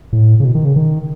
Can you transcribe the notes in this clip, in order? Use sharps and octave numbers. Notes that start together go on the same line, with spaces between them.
A2
C#3
B2
D#3
C#3
D#3